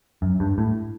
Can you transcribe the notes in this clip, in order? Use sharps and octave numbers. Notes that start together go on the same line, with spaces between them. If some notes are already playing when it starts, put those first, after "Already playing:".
F#2
G2
A2